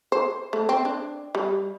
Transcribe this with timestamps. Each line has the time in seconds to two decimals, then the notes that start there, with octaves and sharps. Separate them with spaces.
0.12 C5
0.53 A3
0.69 C4
0.85 D4
1.35 G3